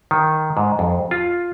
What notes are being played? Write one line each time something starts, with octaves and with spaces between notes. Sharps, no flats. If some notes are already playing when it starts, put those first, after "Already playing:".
D#3
G#2
F2
F4